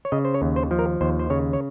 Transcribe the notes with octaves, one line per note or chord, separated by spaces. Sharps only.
C#5
C#3 D#5
C5
C#5
D#2
C5
F3
A#4
D#2 C5
C5
C#3 C#5
C#5